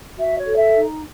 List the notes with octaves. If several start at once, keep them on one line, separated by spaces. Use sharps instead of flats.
F#4 E5
C#5
A4
E5
D#4